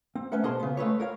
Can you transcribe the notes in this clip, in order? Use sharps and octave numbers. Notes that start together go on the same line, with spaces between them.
C4
A3 C#4 B4 E5 F#5
B2 A#3 G#4 C5 A5 C6
C#3 B3
G#3 A3 B4 C#5
A#4 C#5 F5